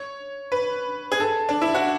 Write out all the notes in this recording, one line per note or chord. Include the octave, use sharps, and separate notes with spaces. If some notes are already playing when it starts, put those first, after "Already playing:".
Already playing: C#5
B4
G#4
A4
D4
E4
F#4